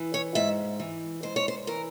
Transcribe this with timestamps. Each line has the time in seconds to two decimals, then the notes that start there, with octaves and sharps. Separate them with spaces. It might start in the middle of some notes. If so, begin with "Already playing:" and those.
Already playing: E3
0.14 C#5
0.35 G#2 E5
0.79 E3
1.23 G#2 C5
1.36 C#5
1.48 C5
1.67 E3 A#4